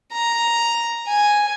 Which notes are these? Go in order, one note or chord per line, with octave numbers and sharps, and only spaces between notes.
A#5
G#5